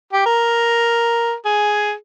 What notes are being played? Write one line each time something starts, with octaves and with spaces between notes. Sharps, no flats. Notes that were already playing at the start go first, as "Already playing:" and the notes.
G4
A#4
G#4